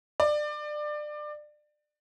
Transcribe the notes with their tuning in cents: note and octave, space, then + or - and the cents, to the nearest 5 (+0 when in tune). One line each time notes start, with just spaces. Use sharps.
D5 +25